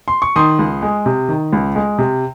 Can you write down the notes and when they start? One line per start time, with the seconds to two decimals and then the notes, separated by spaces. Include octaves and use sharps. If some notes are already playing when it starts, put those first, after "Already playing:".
0.08 C6
0.22 C#6
0.36 D#3 C6 D#6
0.59 C#2
0.82 G#3
1.06 C3
1.29 D#3
1.53 C#2
1.75 G#3
1.98 C3